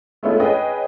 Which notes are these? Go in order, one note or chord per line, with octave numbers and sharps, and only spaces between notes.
G#3 A3 B3 C#4 E4 F4
C#4 G#4 B4 D#5 G5